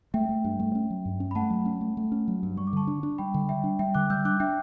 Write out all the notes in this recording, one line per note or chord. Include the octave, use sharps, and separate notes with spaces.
A3 E5 G5
A3
G2
A3
C#4
F#3
G2
C#4
B5
A3 F#5 A5
F#3
C#4
A3
A3
C#4
F#3
G2
G3 C#6
D6
D3 A5 C#6
D4
D4
G3 G5 B5
D3
G3 E5 G5
D4
G3 E5 G5
D3 D6 F#6
G3 E6 G6
D4 D6 F#6
D4 E5 G5